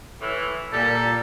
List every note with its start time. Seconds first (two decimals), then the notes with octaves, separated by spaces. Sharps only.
0.21 A2 E3
0.72 A#2 G3 A4